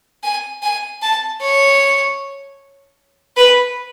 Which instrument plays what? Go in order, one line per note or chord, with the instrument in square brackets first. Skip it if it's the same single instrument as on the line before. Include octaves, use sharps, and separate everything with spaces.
[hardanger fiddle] G#5
G#5
A5
C#5
B4